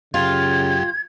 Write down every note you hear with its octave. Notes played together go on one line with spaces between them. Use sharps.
F#2 C#3 F4 G4 G#6